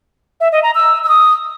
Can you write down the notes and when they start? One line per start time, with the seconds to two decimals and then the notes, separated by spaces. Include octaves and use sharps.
0.40 E5
0.52 D#5
0.63 A#5
0.75 E6
1.04 E6
1.09 D#6